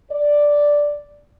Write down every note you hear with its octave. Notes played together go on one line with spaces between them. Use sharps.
D5